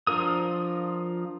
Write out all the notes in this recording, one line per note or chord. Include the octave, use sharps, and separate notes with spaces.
F3 D4 F4 A#4 D#6